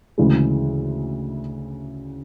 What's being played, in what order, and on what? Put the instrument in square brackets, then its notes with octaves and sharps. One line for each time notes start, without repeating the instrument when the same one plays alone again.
[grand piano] D2 C#3 E3 G#3